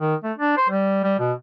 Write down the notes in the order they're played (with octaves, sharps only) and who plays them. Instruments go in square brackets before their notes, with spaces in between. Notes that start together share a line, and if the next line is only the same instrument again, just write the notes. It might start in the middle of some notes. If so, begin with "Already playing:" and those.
[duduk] D#3
A3
D4
C5
G3
G3
B2